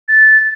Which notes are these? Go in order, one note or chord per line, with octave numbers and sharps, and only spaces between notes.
A6